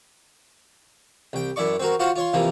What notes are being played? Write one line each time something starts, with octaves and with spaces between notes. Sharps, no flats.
C2 G5
F#2 E4 D5 C#6
C4 F#4 A#4
F4 F#4 C5 F5 F#5
F4 C#5 C6
C3 E3 F3 A#3